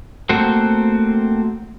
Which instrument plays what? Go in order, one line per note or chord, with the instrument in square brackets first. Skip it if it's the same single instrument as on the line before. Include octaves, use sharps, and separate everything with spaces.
[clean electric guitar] A3 A#3 C4 F#4 C5